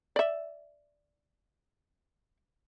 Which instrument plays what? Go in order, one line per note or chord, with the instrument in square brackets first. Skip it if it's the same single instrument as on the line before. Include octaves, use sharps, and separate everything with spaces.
[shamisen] D5 E5